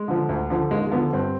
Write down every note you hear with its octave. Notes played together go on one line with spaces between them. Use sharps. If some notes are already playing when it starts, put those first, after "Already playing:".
Already playing: G#3
D3 F3
D2
D3 F3
D#2 G#3
G#3
D3 F3 B3
G2 C4